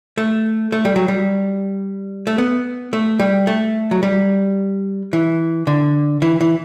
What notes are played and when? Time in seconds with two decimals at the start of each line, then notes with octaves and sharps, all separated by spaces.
0.18 A3
0.72 A3
0.85 G3
0.96 F#3
1.08 G3
2.27 A3
2.38 B3
2.93 A3
3.19 G3
3.47 A3
3.91 F#3
4.03 G3
5.13 E3
5.67 D3
6.22 E3
6.41 E3